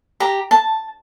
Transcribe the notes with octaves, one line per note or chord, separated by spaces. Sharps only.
G4 A#5
A5